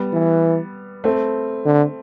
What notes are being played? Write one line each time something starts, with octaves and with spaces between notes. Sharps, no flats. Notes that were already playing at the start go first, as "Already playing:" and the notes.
Already playing: G3 B3
E3
A3 C4
D3